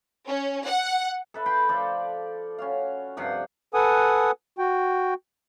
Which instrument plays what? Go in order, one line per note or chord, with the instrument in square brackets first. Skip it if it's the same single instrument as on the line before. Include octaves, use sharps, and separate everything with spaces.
[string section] C#4
F#5
[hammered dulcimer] A4 B4 E5
G5 B5 C6
F3 A4 D5
C#4 F#4 F5
G2 C3 F3 F#5
[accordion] A4 B4 F#5 G#5 D#6
F#4 G5